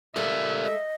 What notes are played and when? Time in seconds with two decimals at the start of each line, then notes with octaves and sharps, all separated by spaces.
0.16 G#3 A3 G4 A4 A#4 D5 E5
0.66 D#5